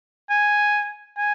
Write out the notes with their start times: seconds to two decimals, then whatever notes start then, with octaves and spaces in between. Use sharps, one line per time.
0.30 G#5
1.18 G#5